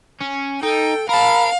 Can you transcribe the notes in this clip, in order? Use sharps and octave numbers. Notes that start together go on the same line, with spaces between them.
C#4
D#4 A4 G5
A#4 F5 A5 B5